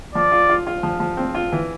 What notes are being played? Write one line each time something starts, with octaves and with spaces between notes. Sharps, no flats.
F3 D5
F4
F4
F4
F3
F3
C4
F4
E3